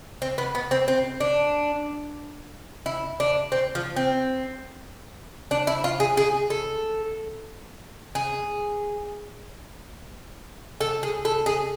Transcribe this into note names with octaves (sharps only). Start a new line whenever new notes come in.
C4
B3
B3
C4
C4
D4
E4
D4
C4
F3
C4
D4
E4
F4
G#4
G#4
A4
G#4
A4
G#4
A4
G#4